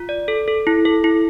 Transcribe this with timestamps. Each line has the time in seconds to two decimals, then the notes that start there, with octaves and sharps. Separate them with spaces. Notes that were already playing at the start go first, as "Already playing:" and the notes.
Already playing: F4
0.09 D5
0.28 A4
0.48 A4
0.67 E4
0.85 A4
1.04 E4